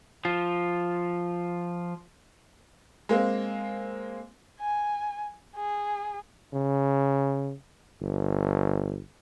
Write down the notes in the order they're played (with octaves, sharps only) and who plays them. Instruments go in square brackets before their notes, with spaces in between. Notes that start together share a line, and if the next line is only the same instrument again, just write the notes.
[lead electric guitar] F3 F4
[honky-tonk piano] G#3 A#3 C4
[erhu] G#5
G#4
[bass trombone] C#3
G1